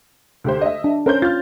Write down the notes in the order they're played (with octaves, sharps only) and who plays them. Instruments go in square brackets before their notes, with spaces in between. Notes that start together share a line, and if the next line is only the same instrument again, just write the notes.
[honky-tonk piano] D2 G4 C5
D#5 E5
[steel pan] D4
[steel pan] C#4 [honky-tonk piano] A#4 C5 G6
[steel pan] F4 [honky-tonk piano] F6 A6